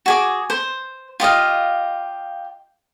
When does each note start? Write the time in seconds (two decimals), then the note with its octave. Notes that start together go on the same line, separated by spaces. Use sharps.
0.06 F#4 G#4 D6
0.50 C5
1.20 F4 G4 D#5 F5